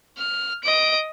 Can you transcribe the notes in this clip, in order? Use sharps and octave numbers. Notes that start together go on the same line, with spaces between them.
F6
D#5 D7